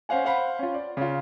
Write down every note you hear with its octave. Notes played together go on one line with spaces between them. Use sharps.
C#4 C5 F5 F#5 G#5
C5 F5 F#5 B5
C#4 F4
D5
C#3 F4